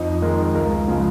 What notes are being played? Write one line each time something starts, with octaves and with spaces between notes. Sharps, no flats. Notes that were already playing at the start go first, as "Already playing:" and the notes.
Already playing: F2 D#4
D#3 G#3 A#4
C#2 A#4
C#3 F3 G#3